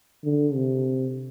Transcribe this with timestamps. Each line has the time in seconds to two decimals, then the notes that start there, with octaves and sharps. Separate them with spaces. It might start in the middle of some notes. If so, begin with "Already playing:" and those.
0.24 D3
0.54 C3